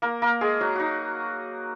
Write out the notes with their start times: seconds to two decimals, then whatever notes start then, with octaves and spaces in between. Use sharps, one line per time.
0.02 A#3 A#4
0.22 A#3 A#4
0.41 G#3 G#4
0.60 F#3 F#4
0.75 D#4 F#4